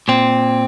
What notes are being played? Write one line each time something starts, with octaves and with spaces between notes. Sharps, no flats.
A#2 C4